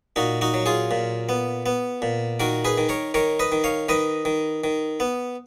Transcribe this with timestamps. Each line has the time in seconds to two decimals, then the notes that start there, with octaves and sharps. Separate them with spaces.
0.16 A#2 D#4 F#4
0.41 D#4 F#4
0.54 F#3
0.66 F4 G#4
0.91 A#2
1.29 B3
1.66 B3
2.02 A#2
2.40 D#3 F#4 A#4
2.65 G#4 B4
2.78 D#3
2.89 A#4 C#5
3.14 D#3 A#4 C#5
3.39 B4 D#5
3.52 D#3
3.64 C#5 F5
3.89 D#3 B4 D#5
4.25 D#3
4.64 D#3
5.00 B3